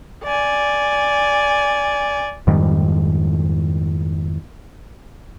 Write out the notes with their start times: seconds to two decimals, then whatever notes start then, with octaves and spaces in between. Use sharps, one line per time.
0.24 D5 G#5
2.47 F2 G#2 D#3 G3